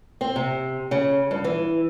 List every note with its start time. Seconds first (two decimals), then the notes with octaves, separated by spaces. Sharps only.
0.21 C4
0.36 C3
0.91 C#3
1.31 G2
1.44 E3